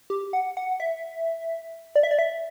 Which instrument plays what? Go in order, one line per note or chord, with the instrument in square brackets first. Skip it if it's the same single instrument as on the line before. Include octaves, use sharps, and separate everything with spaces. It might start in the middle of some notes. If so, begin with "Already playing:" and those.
[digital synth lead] G4
F#5
F#5
E5
D5
E5
D5
E5